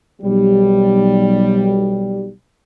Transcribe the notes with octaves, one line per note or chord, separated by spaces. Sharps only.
B1 G3